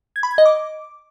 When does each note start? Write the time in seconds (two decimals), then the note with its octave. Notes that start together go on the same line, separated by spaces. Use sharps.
0.16 G#6
0.23 B5
0.31 G#6
0.38 D#5
0.46 D6